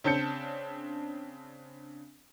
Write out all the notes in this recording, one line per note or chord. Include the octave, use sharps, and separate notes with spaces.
C#3 C4 D4 A5 G6 C#7